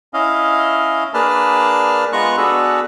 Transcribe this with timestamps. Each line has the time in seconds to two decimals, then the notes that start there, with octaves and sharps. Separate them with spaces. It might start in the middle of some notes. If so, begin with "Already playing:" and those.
0.14 C#4 E4 D#5 F5
1.14 A#3 D4 G#4 B4 A5 F6
2.13 G#3 B3 F4 A#5 C#6 F#6
2.37 B3 D4 F#4 G#4 A4 B4